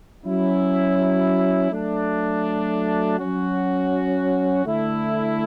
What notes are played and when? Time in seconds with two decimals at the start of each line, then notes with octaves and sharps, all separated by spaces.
0.24 F#3 C#4 E4
1.70 F#3 A3 D4
3.18 F#3 C#4 F#4
4.65 D3 A3 E4